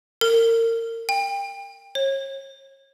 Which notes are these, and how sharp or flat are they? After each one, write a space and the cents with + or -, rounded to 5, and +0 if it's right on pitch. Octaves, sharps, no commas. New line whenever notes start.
A#4 -30
G5 +25
C#5 -35